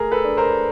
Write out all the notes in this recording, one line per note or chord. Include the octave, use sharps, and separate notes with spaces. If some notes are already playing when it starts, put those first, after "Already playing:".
Already playing: A3 G#4 A#4
A4 B4
D4
A#4 C5